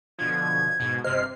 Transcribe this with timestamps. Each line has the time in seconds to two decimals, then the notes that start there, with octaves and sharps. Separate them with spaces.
0.19 B2 D3 F3 G#6
0.80 G#2 B2
1.04 G1 C3 C5 D#5 F6 C7